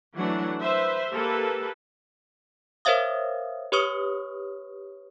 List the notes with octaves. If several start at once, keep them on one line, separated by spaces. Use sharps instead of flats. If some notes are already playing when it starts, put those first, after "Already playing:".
E3 F#3 A3 D4 F#5
B4 C5 E5
A#3 G4 A4 B4
A#4 C5 C#5 E5 F5 D#6
G4 B4 C#5 C#6 D#6 F6